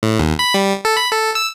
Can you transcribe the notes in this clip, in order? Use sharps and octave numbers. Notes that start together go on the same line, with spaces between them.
A2
D#2
B5
G3
A4
B5
A4
E6